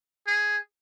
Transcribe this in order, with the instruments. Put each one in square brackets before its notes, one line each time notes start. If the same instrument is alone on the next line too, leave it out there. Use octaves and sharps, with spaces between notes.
[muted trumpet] G#4